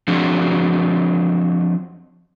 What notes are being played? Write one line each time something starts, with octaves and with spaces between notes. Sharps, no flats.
F3 F#3 C4 D4 F#4 G#4